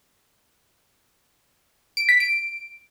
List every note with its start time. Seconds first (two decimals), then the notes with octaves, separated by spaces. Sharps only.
1.97 D7
2.09 B6
2.20 D7